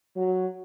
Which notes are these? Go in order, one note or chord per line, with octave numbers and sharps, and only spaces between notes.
F#3